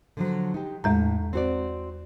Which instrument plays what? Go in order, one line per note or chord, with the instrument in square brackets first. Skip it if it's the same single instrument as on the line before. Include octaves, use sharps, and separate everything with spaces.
[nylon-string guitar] D3 F3 F#3
D#4 G4
[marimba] E2 G#3 A#5 [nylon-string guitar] A2
[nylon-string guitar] C4 F#4 D5